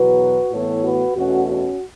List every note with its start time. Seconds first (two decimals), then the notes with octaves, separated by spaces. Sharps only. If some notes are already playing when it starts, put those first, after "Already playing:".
Already playing: E2 B2 F#3 F#4 B4
0.52 A2 E3 B3 A4 C#5
0.84 F#4 B4
1.16 E2 B2 A3 C#4 F#4
1.48 C#4 F#4